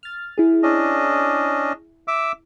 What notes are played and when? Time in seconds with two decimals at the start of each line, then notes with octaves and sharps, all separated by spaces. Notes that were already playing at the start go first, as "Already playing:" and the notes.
0.03 F6 A6
0.38 E4 G#4
0.63 C#4 D4 D#5
2.08 E5 D6 E6